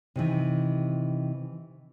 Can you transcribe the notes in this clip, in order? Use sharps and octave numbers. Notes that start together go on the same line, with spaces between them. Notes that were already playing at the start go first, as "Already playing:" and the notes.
C3 D#3 E3